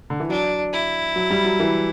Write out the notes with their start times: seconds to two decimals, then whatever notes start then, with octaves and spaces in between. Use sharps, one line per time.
0.10 D3
0.20 E3
0.29 F#3 D4
0.73 E4
1.16 F#3
1.30 G3
1.45 F#3
1.60 E3